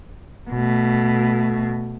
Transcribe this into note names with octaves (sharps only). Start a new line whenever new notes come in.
B2 A3